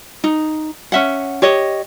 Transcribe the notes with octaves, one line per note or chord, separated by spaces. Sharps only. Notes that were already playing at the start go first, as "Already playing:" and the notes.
D#4
C#4 E5 F#5
G4 C#5 D#5